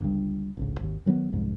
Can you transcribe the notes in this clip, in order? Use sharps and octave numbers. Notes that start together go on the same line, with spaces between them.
G1 C#2 G2
D1 G#1 C#2
G#1 D#2
D#3 F#3 A#3 B3
F#1 C2 F2 G#2